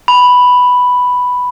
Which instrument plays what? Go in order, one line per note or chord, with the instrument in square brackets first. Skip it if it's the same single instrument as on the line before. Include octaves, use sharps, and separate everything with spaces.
[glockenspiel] B5